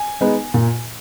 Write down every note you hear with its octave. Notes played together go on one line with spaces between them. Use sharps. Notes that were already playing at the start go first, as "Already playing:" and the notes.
Already playing: G#5
G#3 B3 D#4
A#2